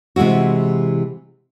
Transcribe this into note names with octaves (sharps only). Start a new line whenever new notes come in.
C3 E3 G#3 E4 F#4